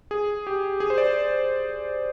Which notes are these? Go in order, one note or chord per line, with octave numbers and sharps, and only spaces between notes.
G#4
G4
G#4
C5
D5